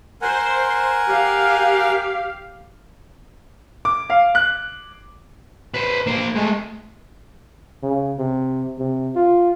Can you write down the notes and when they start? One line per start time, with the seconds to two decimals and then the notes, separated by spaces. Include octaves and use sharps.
0.22 A#4 C5 F#5 G#5
1.08 G4 F5
3.85 D6
4.10 F5
4.35 F#6
5.74 B4 C5
6.07 A#3 C5
6.35 G#3 A3
7.83 C#3
8.18 C3
8.79 C3
9.16 F4